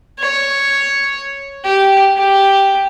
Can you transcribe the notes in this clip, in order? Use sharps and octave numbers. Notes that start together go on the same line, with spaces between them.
C#5
G4
G4